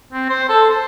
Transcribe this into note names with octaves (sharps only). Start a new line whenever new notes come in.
C4
C5
A4
C5